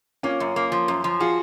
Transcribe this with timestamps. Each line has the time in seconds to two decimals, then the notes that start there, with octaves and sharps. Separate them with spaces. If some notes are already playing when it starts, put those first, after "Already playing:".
0.23 A#3 C#4 F4
0.40 F#2
0.56 A#3
0.72 F3
0.88 F#2
1.04 F3
1.20 F4 F#4 G#4